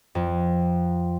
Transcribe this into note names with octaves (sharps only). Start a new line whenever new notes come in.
F2